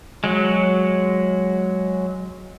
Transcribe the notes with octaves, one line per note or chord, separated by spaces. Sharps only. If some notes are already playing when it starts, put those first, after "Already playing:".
F#3 G#3